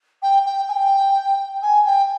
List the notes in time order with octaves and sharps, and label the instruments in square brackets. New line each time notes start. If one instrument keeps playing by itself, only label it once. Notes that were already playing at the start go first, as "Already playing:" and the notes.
[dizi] G5
G5
G#5
G5
G#5
G5